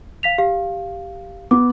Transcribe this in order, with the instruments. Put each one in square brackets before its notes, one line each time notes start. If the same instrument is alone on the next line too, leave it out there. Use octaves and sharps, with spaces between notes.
[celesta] F5 B6 F7
G4 F5
[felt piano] B3 [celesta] D6